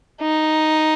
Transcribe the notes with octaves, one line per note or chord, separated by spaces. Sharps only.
D#4